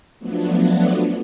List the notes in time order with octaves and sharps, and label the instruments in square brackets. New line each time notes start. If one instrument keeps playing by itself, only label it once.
[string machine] F3 F#3 A3 B3 D4